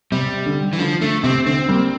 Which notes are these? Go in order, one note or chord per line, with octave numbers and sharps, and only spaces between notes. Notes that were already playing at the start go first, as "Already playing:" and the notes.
C3 G3
D3
E3
D3 F3
D3 A3
C3 C4
D3 C4
G3 A#3